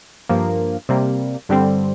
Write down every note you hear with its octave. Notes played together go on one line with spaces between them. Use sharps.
G2 F3 A#3
C3 G3 A#3
G2 D3 G3 C4